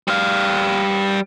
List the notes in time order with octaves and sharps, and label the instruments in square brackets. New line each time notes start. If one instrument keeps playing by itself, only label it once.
[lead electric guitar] G3 F5